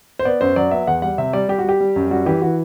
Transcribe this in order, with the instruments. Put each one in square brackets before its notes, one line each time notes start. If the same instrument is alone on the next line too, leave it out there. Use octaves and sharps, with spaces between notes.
[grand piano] C5
B3 D5
F#2 C5
F#3 D5
B3 E5
E2 F#5
G3 F#5
C3 E5
G3 D5
G3 G4
F#4
G3 G4
G3
F#2
G3 F#4
E3 G4
E3 F#4